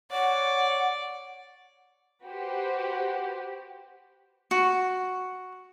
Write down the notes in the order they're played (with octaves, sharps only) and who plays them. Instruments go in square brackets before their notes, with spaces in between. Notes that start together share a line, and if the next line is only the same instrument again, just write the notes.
[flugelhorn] C#5 [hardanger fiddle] D5 [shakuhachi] F#5
[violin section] F#4 G4 B4 C5
[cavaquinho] F#4